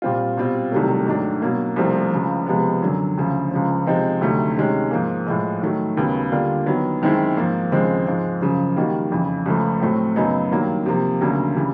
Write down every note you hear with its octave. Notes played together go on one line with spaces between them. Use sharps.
A#2 G3 C4 F4
B2 G3 C4 F4
C2 C3 D#3 F#3 A3
G#2 D#3 F#3 A3 D4
B2 F#3 A#3
C2 C3 F3 A3 C4
C#2 C#3 F3
C#2 C3 F3 G#3 B3
F#2 D3 F#3
D2 C#3 F3
C#2 C#3 F3
C3 F3 G#3 C4 D#4
D2 C3 D#3 F#3 A3
C3 D#3 G#3 C#4
G#2 F3 A#3
A2 F3 G#3
D#3 F#3 A3
D#2 C#3 F#3 B3
D3 G3 A#3 D4 F4
D#3 F#3 B3
F#2 D#3 G#3 C4 E4
G#2 F3 A#3
D#2 C#3 F3 G#3 C4
G#2 F3 G#3
F#2 C#3 F3
D#3 G3 A#3 D#4 F#4
F2 C#3 E3
C#2 C#3 F3 A3
A2 F#3 A3 C4
F#2 C#3 F#3 B3 D#4
G2 D#3 F#3 A#3
C3 F3 A#3
D2 C#3 F#3 A#3 D4
C#3 E3 G3